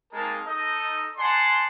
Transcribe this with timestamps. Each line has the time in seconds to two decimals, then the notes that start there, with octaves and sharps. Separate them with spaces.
0.13 G#3 A#3 C4 D#4 A#4 A5
0.46 D#4 A4 D#5
1.17 D5 F#5 G#5 A5 C6